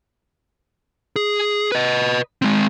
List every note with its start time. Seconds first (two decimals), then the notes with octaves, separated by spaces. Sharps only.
1.16 G#4
1.72 B4 D#5
2.42 G#3 C4